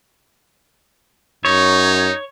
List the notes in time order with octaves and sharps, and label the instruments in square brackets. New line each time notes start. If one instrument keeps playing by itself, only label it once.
[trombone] F#2 [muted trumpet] D#4 [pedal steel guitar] C#5